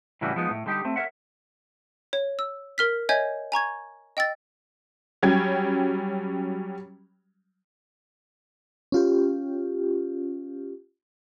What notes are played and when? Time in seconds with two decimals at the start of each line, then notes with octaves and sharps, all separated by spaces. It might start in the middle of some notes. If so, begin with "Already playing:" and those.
0.21 A2 C#3 E3 G3 E4 F#4
0.36 F3 G#3 B3 D#4
0.50 A2
0.66 D3 G3 D#4 G4
0.85 A3 C4
0.96 A#4 C5 C#5 E5 F#5
2.13 C#5
2.39 E6
2.78 A#4 F6 B6
3.09 C#5 D#5 E5 G#5 G6 G#6
3.52 G#5 A#5 C#6 G#6
4.17 D#5 G5 E6 A6
5.22 F#3 G3 C#4 G5 G#6
8.92 C#4 F4 G4